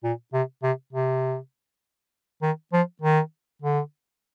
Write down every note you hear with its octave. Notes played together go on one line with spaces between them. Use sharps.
A#2
C3
C3
C3
D#3
F3
D#3
D3